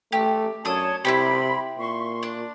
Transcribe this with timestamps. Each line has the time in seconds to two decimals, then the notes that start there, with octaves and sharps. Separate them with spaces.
0.12 A3 G4
0.65 F#2 D4 A4 C#5 A5 D#6
1.05 C3 E4 F#4 G4 B5 C6
1.78 A#2 C6 C#6
2.23 D4